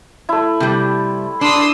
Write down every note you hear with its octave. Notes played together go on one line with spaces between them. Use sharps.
A3 E4
C3 G3
D4 C6 D#6 E6